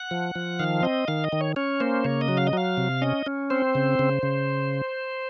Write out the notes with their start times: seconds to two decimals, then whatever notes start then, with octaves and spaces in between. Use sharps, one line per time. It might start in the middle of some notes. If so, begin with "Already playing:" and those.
Already playing: F#5
0.11 F3
0.35 F3
0.59 D#3 F5
0.83 C4 D#5
1.08 D#3 F5
1.24 D#5
1.32 D#3
1.41 C#5
1.56 C#4 C#5
1.80 A#3 C5
2.04 C#3 C#5
2.21 D#5
2.28 F#3
2.37 F5
2.47 D#5
2.53 F#3 F5
2.77 C3
3.02 C#4 D#5
3.26 C#4
3.50 C4 C5
3.75 C#3
3.99 C#3
4.23 C#3